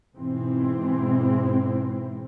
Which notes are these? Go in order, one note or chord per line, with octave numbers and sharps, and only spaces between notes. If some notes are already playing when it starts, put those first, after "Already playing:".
G#2 B2 E3 C4